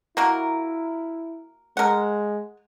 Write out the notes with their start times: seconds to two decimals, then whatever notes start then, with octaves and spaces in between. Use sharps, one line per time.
0.17 A#3 E4 F#4 A#4
1.77 G#3 A#4 F#5